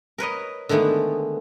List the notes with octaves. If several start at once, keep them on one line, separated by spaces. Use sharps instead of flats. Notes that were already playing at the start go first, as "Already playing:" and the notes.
A#4 B4 C#5 D#5
D3 D#3 G#3 A3 B3